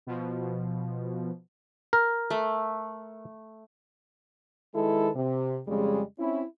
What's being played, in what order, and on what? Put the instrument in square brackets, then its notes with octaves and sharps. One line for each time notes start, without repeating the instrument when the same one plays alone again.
[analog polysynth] B2 F3
[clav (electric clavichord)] A#4
[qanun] A3
[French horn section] D#3 G#3 E4 A4 B4
C3
F2 C#3 G3 G#3
C4 C#4 E4